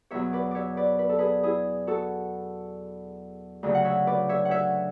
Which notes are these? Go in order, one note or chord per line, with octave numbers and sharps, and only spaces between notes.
E2 B2 F#3 C#5 E5
B4 D5
C#5 D5 E5
B4 D5
B4
A4
G#4 B4
E4 G#4
F#4 A4
D2 C#3 F#3
F#5
C#5 E5
B4 D5
C#5 E5
F#5
C#5 E5